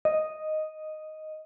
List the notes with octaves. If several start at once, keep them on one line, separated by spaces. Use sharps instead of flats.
D#5